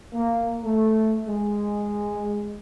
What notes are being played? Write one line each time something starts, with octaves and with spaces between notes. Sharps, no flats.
A#3
A3
G#3